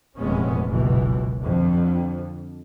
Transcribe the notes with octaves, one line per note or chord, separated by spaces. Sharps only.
F1 E2 A#2 G#3 B3 C#4
F#1 C#2 B2 E3
F2 D3